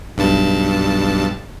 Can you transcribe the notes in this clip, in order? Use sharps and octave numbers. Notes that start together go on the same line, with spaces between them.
B1 G2 A5